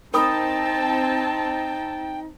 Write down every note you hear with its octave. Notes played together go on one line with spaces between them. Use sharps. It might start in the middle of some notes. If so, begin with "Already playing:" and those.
C4 D#4 A#4 G5 A5 B5 D#6